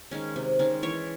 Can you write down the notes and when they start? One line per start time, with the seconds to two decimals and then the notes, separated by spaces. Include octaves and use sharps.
0.11 D#3 G#3 C#4
0.36 C3
0.59 D#3 G#3 C#4
0.83 E3 C#5